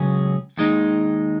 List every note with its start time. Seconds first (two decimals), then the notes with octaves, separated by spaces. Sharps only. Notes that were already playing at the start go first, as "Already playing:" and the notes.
Already playing: C#2 C#3 F#3 C#4 G#4
0.57 D#2 D#3 G#3 D#4